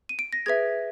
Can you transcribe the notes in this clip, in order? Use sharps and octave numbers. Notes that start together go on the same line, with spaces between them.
D#7
D7
A#6
G#4 B4 E5 G#6